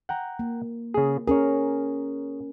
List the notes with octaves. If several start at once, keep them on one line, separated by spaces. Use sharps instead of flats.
F#5 G5 A#5
A#3
C#3 G#4
C#4 G#4 A#4 C#5